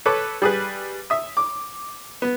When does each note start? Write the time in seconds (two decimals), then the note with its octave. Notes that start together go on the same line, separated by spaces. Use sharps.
0.06 A4 B4 C#5 D6
0.42 G3 G#4 B4
1.10 E5 D#6
1.37 D6
2.22 B3